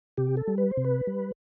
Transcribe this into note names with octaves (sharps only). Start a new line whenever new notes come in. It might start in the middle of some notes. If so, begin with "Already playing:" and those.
C3 G4
A4
G3
B4
C5
C3
B4
G3